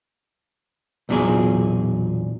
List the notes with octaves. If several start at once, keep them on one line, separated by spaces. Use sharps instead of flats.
B1 E2 A#2 F#3 G#4